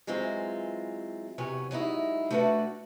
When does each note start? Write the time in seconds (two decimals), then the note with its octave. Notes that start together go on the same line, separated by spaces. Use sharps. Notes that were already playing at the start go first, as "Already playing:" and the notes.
0.07 E3 F#3 G#3 C4 F4
1.38 E2 C3 F#3 C#5 G#5
1.71 F#3 G#3 D#4 E4
2.31 A3 D4 F#4 B4 D5 F#5